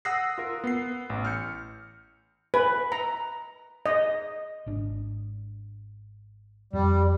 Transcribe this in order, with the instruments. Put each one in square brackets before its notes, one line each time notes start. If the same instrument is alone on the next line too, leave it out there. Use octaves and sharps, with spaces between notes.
[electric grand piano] F#5 D#6 E6 F#6 A#6 C7
F4 A#4
B3 C7
A1
F6 G6 C#7
[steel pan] B4
A#5
D#5
[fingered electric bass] G#1 D4
[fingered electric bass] F2 [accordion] G3